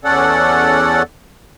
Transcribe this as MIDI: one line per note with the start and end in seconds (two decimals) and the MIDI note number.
0.04 1.02 40
0.04 1.02 61
0.04 1.02 69
0.04 1.02 74
0.04 1.02 78